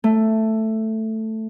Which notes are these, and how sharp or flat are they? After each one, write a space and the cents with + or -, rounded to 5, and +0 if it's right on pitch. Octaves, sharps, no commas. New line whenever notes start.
A3 +5